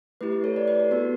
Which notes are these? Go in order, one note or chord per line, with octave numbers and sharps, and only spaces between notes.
A3 E4 G4 B4
B4
A4 C#5
B4 D5
B4
A4
B3 F#4 A4 B4